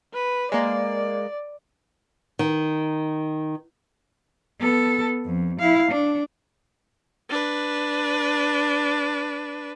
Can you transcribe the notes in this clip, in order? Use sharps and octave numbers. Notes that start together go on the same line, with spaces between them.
B4
G#3 A#3 D5
D#3
B3 A4
F2
E4 F5
D4
D4 B4